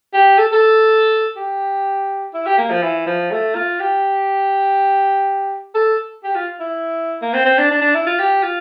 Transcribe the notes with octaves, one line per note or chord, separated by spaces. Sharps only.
G4
A4
A4
G4
E4
G4
A#3
F3
E3
F3
A3
F4
G4
A4
G4
F4
E4
A#3
C4
C4
D4
D4
D4
E4
F4
G4
F4